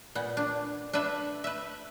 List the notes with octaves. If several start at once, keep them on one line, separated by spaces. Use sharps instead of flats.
A#2 B3
D4
D4 A4 B4 E5
B4 E5